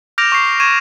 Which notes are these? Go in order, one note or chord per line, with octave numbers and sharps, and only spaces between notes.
D6 F6 G6 A#6 D7 F7
C#6 C7
C#6 G#6 D#7 E7